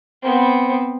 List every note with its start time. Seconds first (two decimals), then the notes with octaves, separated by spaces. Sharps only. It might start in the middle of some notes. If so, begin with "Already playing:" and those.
0.23 B3 C4